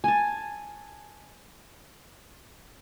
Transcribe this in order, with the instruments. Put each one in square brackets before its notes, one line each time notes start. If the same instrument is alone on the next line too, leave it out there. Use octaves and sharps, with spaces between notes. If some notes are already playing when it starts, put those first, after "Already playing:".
[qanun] G#5 A5